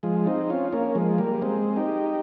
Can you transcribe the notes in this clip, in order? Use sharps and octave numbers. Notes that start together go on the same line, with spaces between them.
F3 G#3
C4 D#4
C#4 F4
A#3 C#4
F3 G#3
G3 A#3
G#3 C4
D#4 G4